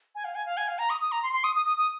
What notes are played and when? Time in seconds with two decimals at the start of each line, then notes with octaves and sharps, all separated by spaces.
0.15 G#5
0.24 F5
0.35 G#5
0.46 F5
0.57 G#5
0.68 F5
0.79 A#5
0.90 D#6
1.01 D#6
1.12 A#5
1.23 C6
1.33 C6
1.44 D#6
1.55 D#6
1.66 D#6
1.77 D#6